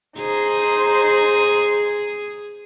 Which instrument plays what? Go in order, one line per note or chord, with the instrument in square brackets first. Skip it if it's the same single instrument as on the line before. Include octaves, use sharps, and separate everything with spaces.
[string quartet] D#4 C5 [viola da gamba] G#4